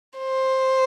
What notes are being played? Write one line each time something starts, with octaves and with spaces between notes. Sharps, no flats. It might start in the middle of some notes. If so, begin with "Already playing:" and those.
C5